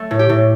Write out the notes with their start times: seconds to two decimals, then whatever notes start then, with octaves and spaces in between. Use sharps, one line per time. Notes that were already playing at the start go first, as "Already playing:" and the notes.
Already playing: A3
0.11 A2
0.19 G4
0.29 A2